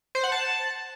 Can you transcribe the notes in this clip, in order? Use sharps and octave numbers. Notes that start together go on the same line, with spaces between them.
C5
F#5
A5